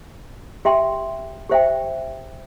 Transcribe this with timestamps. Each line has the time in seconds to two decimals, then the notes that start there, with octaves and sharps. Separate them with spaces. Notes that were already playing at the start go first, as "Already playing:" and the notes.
0.65 G4 E5 G5 C6
1.49 G4 C5 E5 G5